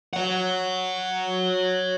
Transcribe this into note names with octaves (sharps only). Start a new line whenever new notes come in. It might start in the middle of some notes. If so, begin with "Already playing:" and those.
C#5 F#5